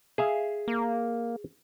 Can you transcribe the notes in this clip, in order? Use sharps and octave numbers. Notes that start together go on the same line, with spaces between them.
G#4 E5 F5
A#3